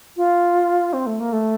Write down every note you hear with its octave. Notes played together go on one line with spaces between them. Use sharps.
F4
C4
A3
A#3
A3